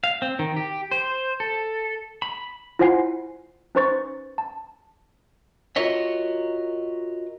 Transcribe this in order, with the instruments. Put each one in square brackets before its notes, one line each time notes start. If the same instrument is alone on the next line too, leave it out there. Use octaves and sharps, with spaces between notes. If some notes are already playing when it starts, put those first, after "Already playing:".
[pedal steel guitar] F5
C4
D#3
G4
C5
A4
B5
[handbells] E4 F4 C5 F#5 G#5 C7
C#4 D#4 B4 C5 C#6 A6
A5
[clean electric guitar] F4 F#4 A#4 C#5 D#5 E5